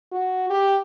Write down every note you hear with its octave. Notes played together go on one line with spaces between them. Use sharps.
F#4
G4